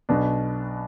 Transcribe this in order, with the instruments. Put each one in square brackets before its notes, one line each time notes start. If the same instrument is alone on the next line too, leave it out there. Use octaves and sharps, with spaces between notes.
[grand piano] B1 B2 B3 D4